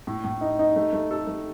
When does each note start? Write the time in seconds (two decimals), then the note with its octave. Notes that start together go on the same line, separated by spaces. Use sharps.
0.07 A2
0.24 A2
0.41 D#4
0.59 D#4
0.76 A3
0.93 A3
1.11 A4
1.27 A3